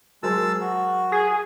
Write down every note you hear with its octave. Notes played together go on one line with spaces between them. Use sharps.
F#3 G#3 A#4 C5 A5 E6
F#4
G#4 G#5